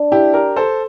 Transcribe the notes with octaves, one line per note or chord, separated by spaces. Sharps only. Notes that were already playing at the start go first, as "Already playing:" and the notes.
Already playing: D4
E4 G4
G4 A#4
A4 C5